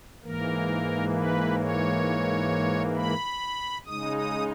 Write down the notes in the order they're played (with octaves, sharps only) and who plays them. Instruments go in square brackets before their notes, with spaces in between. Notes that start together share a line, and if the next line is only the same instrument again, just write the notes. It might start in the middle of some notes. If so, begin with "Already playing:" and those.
[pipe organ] G#2 E3 A#3 A#4
B4
C#5
B5
C#3 G#3 D#4 D#6
D#6